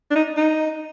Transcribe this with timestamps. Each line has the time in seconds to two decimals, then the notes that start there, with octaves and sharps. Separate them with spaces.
0.11 D4
0.15 D#4
0.37 D#4